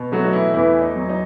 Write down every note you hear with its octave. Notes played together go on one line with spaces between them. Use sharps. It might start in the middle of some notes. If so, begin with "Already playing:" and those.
Already playing: B2
F#3 A3 F#4
D#4
E3 E4
E2 E3 E4
D#4
F#3
D#4